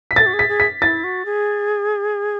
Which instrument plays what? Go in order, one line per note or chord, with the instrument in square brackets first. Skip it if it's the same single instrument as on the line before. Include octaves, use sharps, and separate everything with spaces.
[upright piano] B6
[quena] A4 [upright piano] A6
[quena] F#4
G#4
[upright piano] B6
[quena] G#4
[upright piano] B6
[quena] E4 [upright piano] A6
[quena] F#4
G#4